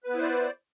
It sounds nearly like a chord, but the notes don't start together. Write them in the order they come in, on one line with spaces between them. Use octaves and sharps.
B4 B3 E4 C5 D5